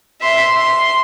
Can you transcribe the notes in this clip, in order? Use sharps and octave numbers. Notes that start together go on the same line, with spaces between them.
E5 C6
C6